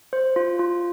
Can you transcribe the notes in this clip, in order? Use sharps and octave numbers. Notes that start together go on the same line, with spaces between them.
C5
F4
F4